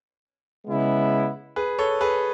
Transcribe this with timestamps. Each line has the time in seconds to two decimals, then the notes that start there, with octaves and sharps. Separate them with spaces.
0.67 C#3 G#3 B3 E4
1.56 G#4 B4
1.78 A4 C#5
2.01 G#4 B4